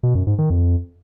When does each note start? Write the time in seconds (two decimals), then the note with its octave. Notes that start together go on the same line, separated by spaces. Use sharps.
0.03 B2
0.15 F#2
0.27 G#2
0.38 D#3
0.50 F2